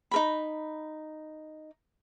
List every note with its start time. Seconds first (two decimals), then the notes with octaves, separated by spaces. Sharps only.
0.11 D#4 A#4 B5